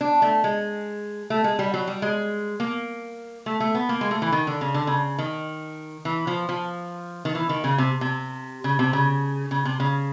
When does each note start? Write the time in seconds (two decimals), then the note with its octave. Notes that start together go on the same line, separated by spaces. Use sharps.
0.01 D4
0.22 A3
0.44 G#3
1.30 A3
1.44 G#3
1.59 G3
1.74 F#3
1.87 G3
2.02 G#3
2.60 A#3
3.46 A3
3.60 A3
3.75 B3
3.89 A#3
4.01 G#3
4.11 A3
4.22 E3
4.32 D#3
4.47 D3
4.61 C#3
4.74 D3
4.87 C#3
5.18 D#3
6.05 E3
6.27 F3
6.49 F3
7.25 D#3
7.35 E3
7.49 D#3
7.64 C#3
7.78 C3
8.01 C3
8.64 C#3
8.79 C3
8.93 C#3
9.51 C#3
9.65 C3
9.80 C#3